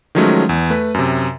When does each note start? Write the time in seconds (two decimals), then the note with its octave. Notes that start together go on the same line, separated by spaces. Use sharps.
0.15 D#3 F3 F#3 G#3 A3 C#4
0.49 E2
0.70 A3 B4
0.94 F#2 C3